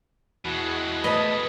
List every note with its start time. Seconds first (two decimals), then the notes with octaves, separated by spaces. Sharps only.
0.45 E2 B2 G#3 F#4
1.04 E2 A3 B4 D#5 B5